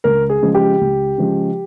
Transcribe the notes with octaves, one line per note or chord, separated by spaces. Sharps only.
C#2 A#4
G#4
C#3 F3 G#3
G4
C#2
C#3 F3 G#3